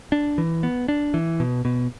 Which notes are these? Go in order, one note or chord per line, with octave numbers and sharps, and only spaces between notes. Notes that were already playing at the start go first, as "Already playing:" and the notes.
D4
E3
B3
D4
E3
B2
B2